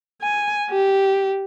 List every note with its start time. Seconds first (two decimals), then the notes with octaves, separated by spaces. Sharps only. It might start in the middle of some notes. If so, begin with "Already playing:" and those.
0.22 G#5
0.70 G4